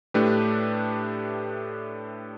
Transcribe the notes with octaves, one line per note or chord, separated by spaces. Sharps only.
A2 A3 D4 G4 B4